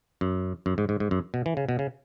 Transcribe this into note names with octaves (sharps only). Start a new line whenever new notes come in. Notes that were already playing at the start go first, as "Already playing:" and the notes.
F#2
F#2
G#2
G#2
G#2
F#2
B2
E3
C#3
B2
C#3